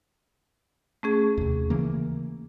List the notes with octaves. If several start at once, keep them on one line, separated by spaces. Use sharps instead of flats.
A3 C#4 G#4
D#2 C3
C#3 E3 A#3